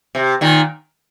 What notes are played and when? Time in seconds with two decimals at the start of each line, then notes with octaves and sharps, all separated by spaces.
0.15 C3
0.41 A#2 D#3